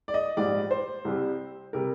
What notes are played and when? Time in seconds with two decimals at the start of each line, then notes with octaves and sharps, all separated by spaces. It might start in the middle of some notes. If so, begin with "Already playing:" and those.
0.08 D5
0.14 D#5
0.37 A#1 G#2 G3 D5
0.71 C5
1.05 C2 C3 G3
1.73 C3 G3 A#4